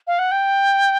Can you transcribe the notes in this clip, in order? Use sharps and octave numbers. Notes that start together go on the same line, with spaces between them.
F5
F#5
G5